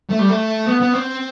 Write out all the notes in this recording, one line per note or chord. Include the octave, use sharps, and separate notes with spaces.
A3
G3
A3
B3
B3
C4